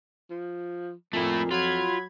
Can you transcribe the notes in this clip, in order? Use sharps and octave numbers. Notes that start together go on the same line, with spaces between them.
F3
F2 A#2 A3 E4
F#3 F4 B5 G#6